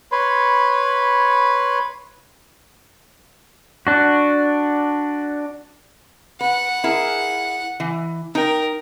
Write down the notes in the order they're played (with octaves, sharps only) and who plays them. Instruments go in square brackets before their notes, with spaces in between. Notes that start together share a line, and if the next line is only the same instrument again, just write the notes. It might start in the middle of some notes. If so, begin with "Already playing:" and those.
[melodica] B4 C#5 B5 C6
[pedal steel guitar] D4 F#4
[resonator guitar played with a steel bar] B4 [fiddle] F#5
[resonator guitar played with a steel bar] E4 G#4 A#4
E3
[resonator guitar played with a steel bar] D#4 G5 [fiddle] A#4